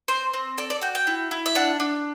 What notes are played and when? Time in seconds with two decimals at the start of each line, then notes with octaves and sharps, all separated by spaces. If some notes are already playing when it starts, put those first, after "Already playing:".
0.08 C4 C5
0.34 C4
0.58 A4 D5
0.70 D5
0.81 F#4 G5
0.95 G5
1.07 E4
1.31 E4
1.46 E5
1.55 D4 F#5
1.80 D4